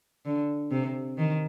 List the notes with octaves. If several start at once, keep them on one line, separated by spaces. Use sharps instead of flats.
D3
C3
D#3